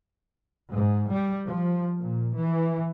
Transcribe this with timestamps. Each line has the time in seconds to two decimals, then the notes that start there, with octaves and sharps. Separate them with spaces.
0.70 G#2
1.10 G3
1.47 F3
2.01 A#2
2.38 E3